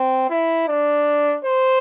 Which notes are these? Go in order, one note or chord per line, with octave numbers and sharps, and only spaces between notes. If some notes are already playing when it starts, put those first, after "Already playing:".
Already playing: C4
E4
D4
C5